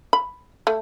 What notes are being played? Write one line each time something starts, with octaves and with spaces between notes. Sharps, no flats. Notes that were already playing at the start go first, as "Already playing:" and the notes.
B5
A3